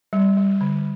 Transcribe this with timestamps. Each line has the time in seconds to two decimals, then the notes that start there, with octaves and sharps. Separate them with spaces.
0.13 G3
0.37 G3
0.61 D3